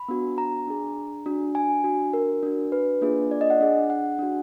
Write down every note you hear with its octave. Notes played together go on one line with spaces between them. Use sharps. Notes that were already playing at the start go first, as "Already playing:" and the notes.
Already playing: B5
B3 D4 F#4
A#5
D4 G#4
D4 F#4
G#5
D4 F#4
A#4
D4 F#4
B4
A#3 D4 F4 G#4
D5
D#5
F#5
D4 G#4
F#5
D4 F#4